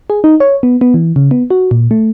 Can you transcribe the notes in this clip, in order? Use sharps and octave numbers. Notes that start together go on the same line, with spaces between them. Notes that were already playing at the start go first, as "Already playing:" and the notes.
G#4
D#4
C#5
B3
B3
E3
C#3
B3
F#4
A#2
A3